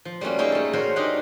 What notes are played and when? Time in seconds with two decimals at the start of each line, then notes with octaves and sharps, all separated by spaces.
0.05 F3
0.21 G3 A3 A#3 C#4 F#4
0.38 A#3 D#4 G#4 C#5 E5 G5
0.52 A3 A4
0.73 C#4 F#4 A#4 C5 C#5 A#5
0.96 D4 D#4 G4 A#4 D#5 F#5